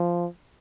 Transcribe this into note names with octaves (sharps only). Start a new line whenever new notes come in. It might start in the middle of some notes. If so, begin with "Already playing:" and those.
Already playing: F3